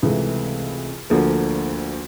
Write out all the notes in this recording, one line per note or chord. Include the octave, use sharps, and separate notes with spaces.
C#2 C3 E3 A3
D2 D3 F3 A#3